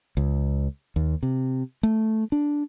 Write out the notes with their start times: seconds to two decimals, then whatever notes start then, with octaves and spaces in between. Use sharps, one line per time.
0.17 C#2
0.96 D#2
1.23 C3
1.83 A3
2.32 D4